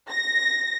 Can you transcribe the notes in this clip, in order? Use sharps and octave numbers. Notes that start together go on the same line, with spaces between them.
A#6